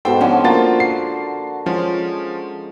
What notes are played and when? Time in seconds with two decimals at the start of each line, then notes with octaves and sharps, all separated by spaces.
0.05 G#2 B2 A4 C5 G5 A5
0.21 D3 F3 C#4 F4
0.44 A#3 F4 F#4 A#4 C5 A6
0.80 C7
1.66 F3 G#3 C#4